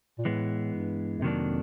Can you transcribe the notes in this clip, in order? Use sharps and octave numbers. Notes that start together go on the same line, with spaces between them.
A#2
A2 E3 G#3 B3
G2
F#2
F2 C3 D#3 F#3 A#3 D4